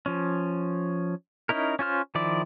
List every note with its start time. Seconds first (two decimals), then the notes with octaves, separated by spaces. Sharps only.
0.06 F3 C#4
1.49 C#4 D#4 E4 A#4
1.79 C#4 F4 C5 F6
2.15 D#3 F3 E4 D5